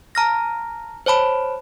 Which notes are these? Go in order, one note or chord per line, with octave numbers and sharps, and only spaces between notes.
A5 A#5 F6 A#6
C5 C#5 A5 B5